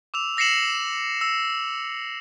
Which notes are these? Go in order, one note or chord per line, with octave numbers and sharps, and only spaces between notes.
D6 E6 F7
E6 A#6 C7 C#7 E7 F#7
E6